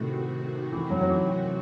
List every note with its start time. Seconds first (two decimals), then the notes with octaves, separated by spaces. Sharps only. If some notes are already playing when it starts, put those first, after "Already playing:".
Already playing: A2 C3 D#3 A3 C4 F#4
0.72 E3
0.90 F#3
1.00 F#3
1.09 E3